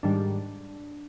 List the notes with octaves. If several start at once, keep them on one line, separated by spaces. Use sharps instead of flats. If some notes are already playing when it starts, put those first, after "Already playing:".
G#2 D#3 G3 D4